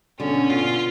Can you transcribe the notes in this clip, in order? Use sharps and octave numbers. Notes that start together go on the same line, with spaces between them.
B2 D3 C#4
B2 F4